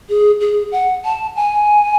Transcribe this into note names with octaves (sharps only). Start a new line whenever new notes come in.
G#4
G#4
F#5
A5
G#5